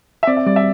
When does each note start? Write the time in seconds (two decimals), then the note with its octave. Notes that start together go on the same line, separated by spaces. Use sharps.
0.23 E5
0.27 C4 D5
0.37 E5
0.46 G3 D5
0.56 E5